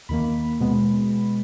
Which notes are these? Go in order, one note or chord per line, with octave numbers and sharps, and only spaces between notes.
D#2 D#3 A#3 B5
B2 G#3 B3